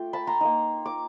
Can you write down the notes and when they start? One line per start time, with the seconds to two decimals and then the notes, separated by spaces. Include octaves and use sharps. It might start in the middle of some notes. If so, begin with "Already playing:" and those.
Already playing: A3 D4 F4 G5
0.13 A5 B5
0.27 A#5 C6
0.41 A#3 D#4
0.86 D6